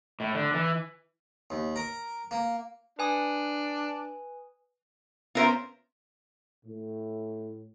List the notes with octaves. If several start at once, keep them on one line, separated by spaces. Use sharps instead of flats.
A2
D3
E3
D#2
A#4
A#3
D4 B4 G#5 D#6
B3 C#4 F4 A#4 C5 E5
A2